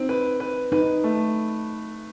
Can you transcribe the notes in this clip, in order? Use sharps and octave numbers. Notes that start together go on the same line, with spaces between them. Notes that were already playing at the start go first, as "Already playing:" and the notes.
Already playing: C4 D#4
B4
B4
D#4 B4
A3